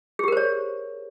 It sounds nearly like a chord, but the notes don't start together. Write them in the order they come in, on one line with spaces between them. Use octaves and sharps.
G#4 G4 A#4 C5 C#5